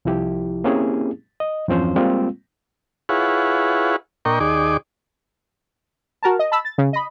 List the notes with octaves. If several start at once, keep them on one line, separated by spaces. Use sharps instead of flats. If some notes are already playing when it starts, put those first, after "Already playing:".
C2 F3 E4 G4
A#3 C4 C#4 E4 G4 G#4
D#5
E2 G2 F3 C4 C#4 C5
G3 G#3 A#3 C4 F4
E4 F4 G#4 B4 C#5 F#5
A#2 D4 A#4 D#5 G5 C#6
D#2 D#4 G#4 D5 D6
F#4 A#4 A5
D#5
A5 B5 E6
A6
C#3
D#5 B5